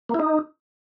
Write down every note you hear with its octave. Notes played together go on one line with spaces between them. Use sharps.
A#3
E4
D#4